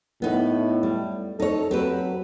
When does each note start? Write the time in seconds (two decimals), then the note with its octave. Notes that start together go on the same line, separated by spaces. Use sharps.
0.22 A2 B3 D#4
0.83 G3
1.40 D#4 A4 C#5
1.71 F#3 C4 G4 B4